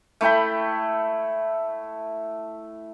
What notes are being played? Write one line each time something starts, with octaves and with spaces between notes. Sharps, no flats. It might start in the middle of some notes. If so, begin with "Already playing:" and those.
A3 E4 G5 B5